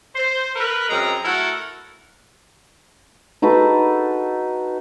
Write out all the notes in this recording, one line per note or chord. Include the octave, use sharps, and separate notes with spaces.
C5
A#4 B4
F#2 G#3 C4 A#5
A3 E4 F#4 A4 A#4
D#4 F#4 A4 B4